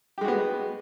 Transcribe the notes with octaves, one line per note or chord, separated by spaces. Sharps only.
G#3 B3 F#4 G4